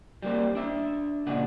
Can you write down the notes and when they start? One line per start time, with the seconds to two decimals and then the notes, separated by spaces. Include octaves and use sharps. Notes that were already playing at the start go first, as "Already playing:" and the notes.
0.22 G3 A#3 C5
0.55 D4 E5
1.26 C#2 A#2 D3 G#3 D4 F#5